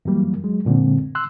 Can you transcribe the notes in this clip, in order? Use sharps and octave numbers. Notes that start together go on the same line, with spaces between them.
F#2 E3 F#3 G3 A#3
F#3 G#3
F#2 A#2 D3 G#3 C4
C6 E6 F#6